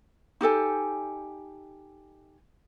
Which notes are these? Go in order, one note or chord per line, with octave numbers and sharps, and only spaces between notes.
D#4 G4 A4 G#5